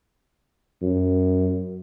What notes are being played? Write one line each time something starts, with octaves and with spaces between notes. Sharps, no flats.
F#2